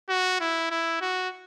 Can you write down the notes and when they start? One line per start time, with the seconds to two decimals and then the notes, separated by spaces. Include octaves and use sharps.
0.09 F#4
0.40 E4
0.71 E4
1.01 F#4